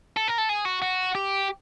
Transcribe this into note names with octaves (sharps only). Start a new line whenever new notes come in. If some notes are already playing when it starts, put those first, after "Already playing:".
A4
A#4
A4
G#4
F#4
F#4
G4